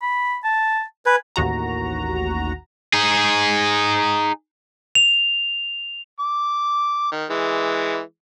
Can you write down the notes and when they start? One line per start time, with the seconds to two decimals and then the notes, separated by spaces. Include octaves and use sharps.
0.02 B5
0.44 A5
1.06 B4 G#5
1.36 A1 D#2 F#4 A#5
2.93 D#4 G#4
4.95 F7
6.19 D6
7.12 D#3
7.30 E3 G#3